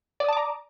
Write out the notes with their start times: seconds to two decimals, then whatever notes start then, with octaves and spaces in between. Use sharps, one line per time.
0.20 D5
0.24 D#6
0.28 A5
0.33 D6
0.37 A#5